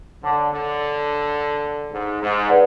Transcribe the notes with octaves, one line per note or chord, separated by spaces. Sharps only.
D3 C#5 F#5 A5 D6
D3
G#2
G#2
B4 D5 F#5